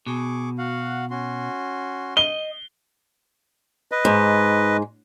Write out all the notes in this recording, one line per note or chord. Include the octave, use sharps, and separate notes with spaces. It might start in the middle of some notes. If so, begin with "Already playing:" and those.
B2 G#4 C#6 D6
F#4 F5 F#5
C#4 F#4 C6
D#5 G7
B4 D#5
G#2